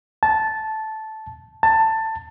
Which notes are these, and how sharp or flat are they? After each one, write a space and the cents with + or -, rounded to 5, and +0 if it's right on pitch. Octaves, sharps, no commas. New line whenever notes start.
A5 -10
A5 +15